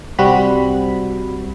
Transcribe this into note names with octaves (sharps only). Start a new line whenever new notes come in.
C2 G3 C4 F#4 B5